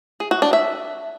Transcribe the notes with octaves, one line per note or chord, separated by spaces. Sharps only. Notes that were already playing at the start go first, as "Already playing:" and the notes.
G#4
F#4
D4
E5